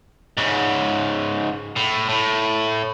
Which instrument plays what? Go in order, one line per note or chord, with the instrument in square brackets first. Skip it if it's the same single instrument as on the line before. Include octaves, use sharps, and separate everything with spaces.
[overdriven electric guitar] G#2 C#3
A2
A2